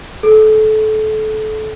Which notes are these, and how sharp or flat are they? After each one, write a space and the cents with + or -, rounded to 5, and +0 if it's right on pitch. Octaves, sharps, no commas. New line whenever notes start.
A4 -25